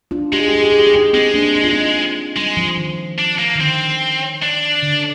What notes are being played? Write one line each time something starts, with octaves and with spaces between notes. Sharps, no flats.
D4 F4
G#3 G4
G#4
G4
G#4
G4
G#4
G4
G#4
D#4 G4
G#3 C4 D#4
A#3 D4
D#4
F4
C4 D#4
G3 G#3
F3
D#3
D4
A#3
D#3
D3 C4
D4
D3